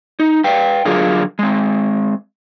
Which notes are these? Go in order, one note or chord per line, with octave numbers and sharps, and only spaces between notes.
D#4
B4 F5 G5
D3 F#3 F4 G#4 A#4
G#3 C4